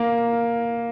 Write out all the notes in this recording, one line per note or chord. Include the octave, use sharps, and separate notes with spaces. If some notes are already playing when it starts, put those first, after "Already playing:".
Already playing: A#3